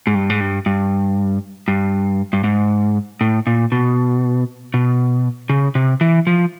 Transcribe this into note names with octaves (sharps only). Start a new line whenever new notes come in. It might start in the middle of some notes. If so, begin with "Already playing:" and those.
G#2
G2
G#2
G2
G2
G2
G2
G#2
A2
A#2
B2
B2
C#3
C3
E3
F3